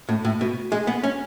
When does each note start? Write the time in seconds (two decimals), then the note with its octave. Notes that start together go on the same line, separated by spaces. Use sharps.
0.09 A2
0.25 A2
0.41 B2
0.72 G#3
0.87 B3
1.04 C#4